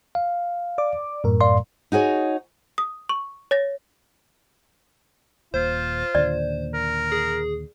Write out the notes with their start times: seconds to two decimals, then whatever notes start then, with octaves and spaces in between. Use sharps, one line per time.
0.15 F5
0.78 D5 D6
1.24 F#2 A2 A#4
1.41 D5 F5 C6
1.92 D#4 F#4 G#4 C#5
2.78 D#6
3.09 C#6
3.51 C#5 A6 A#6
5.54 D#1 A#2 F4 C5
6.15 D#2 A#2 D3 D5
6.74 A#4
7.12 G#4